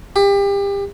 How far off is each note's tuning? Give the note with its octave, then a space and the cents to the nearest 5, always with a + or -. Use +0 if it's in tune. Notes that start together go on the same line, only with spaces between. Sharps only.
G4 +30